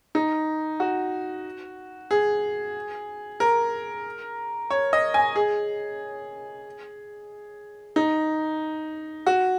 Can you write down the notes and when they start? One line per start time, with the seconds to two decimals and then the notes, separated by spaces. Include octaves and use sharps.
0.15 D#4
0.80 F#4
2.11 G#4
3.40 A#4
4.71 C#5
4.93 D#5
5.14 G#5
5.36 G#4
7.96 D#4
9.26 F#4